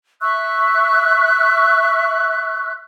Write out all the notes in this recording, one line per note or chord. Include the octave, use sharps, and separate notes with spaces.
E5 C#6 E6 F#6